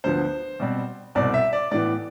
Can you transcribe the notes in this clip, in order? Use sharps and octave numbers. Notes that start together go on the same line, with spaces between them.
D2 D3 F3 B3 C5
B2 G3 C4
C2 B2 G3 C4 D5
E5
D5
A2 E3 B3 D5